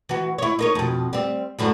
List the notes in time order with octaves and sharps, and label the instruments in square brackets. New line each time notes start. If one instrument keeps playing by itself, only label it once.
[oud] E3 F#4
E4 C#5
D#4 A#4 C#5
F2 B2
G3 C4
F#2 A2 D3